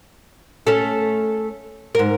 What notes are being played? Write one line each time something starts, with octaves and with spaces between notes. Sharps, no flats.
A3 C#4 A4
G#2 A#4